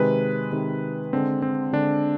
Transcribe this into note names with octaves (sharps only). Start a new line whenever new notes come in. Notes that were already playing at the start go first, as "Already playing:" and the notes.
Already playing: C3 D#3 G#3 B4
C3 D#3 G#3
D3 G#3 C4
C4
D3 G#3 D4